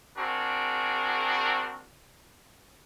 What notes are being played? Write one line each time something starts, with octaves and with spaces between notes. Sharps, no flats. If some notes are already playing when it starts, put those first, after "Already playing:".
C4 D4 F#4 G#4 A#4